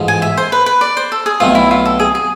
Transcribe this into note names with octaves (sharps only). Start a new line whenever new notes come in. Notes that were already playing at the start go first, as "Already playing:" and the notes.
Already playing: A1 G#2 F3 G#3
G#5
E5
C5
B4
B4
D5
C5
A4
G#4
B1 B2 A3 C4 F4
E4
F4
A4
G#4
G#4